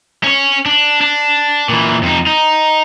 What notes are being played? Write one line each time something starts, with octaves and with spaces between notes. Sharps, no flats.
C#4 C#5
D4
D4
A#2 E3
F2 D#4
D#4